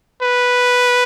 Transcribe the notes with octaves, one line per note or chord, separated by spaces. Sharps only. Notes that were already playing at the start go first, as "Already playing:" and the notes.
B4